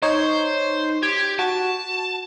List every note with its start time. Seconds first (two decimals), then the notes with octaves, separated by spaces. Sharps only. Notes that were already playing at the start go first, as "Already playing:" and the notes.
0.02 D#4 C5 C#5
1.03 G4 G#6
1.39 F#4 A5